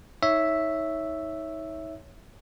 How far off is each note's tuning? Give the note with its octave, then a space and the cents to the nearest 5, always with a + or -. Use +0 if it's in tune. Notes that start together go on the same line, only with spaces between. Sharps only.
D#4 +30 C#5 +0 E5 +0